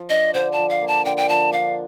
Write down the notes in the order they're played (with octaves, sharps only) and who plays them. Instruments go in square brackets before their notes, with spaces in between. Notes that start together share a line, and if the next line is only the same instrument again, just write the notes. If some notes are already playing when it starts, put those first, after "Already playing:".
Already playing: [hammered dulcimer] F3
[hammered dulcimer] D4 [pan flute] D#5
[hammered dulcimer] D3 [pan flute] C5
[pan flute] A5
[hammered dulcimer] F3
[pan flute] F5
[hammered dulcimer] A#3
[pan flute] A5
[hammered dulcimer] D3 [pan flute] G5
[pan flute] G5
[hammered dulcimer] F3 [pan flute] A5
[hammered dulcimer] D4 [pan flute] F5